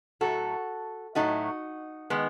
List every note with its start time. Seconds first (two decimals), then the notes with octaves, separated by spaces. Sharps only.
0.21 A2 F#3 A3 F#4 A4
1.15 A2 F#3 A3 D#4 F#4
2.10 D#3 G#3 B3